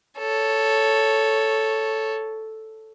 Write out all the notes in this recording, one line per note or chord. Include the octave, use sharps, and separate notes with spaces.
A4 C#5